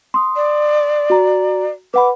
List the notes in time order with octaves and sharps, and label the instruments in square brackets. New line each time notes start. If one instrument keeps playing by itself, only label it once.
[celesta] C6 D#6
[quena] D5
[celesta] F#4 A#5
[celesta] B4 F#5 B5 [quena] D6